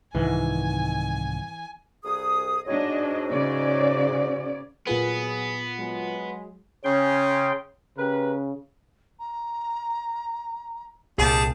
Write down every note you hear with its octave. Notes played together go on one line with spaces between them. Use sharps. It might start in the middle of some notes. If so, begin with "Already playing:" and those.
C2 G#2 D#3 E3 G#5
C2 G#4 D#6
G#2 D4 F#4 C#5 D#5
C#3 D5
A#2 F#3 B3 F4 G#4 B4
F#3 G#3
C#3 C#4 C#5 G5 C6
C#3 G4 A#4 B4
A#5
C2 A#2 G3 G#4 A5